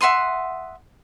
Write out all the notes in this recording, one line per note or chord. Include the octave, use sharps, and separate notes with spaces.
E5 F#5 C6 D#6